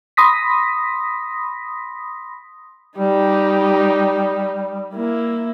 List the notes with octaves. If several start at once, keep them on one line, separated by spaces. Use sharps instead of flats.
B5 C6 D#6 A#6 B6
G3 D#4 G4
A#3 E4